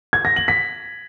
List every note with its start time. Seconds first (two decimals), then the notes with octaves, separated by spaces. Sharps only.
0.13 G#6
0.25 A#6
0.36 F#7
0.48 B6